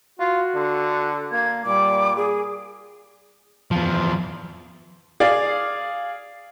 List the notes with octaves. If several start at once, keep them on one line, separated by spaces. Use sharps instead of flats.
F4 F#4
D3
A#3 G#6
A#2 G3 D6
G#4
E2 F3
G#4 D5 F5